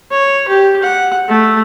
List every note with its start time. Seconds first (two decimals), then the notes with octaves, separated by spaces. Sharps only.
0.11 C#5
0.48 G4
0.83 F#5
1.29 A3